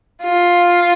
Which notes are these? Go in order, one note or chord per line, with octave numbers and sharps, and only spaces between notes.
F4